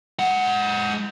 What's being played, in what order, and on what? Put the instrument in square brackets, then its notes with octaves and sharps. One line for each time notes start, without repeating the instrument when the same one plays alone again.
[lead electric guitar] G#3 F#5